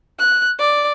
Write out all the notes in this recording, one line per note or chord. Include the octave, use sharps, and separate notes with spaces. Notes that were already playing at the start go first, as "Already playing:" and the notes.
F#6
D5